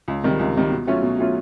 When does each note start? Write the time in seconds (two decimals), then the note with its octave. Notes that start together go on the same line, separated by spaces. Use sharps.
0.08 C#2
0.23 C3 D#3 G3
0.39 C#2
0.55 C3 D#3 G3
0.71 B2
0.87 F#3 A3 C#4 F4
1.03 B2
1.19 F#3 A3 C#4 F4